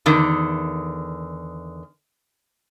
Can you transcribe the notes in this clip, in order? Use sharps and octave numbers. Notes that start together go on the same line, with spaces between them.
E2 D3 D#3